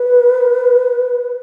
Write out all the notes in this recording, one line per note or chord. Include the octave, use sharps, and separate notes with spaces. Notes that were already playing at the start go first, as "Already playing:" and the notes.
Already playing: B4